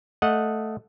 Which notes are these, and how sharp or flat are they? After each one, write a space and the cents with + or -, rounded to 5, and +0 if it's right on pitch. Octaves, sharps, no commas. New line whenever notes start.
A3 +0 D#5 +0 F#5 -20